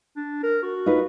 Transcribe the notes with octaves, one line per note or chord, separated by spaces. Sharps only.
D4
A#4
F#4
D#4 F4 B4